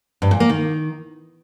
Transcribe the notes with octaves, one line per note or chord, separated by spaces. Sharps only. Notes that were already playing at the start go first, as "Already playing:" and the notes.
G2
A#2
A#3
D#3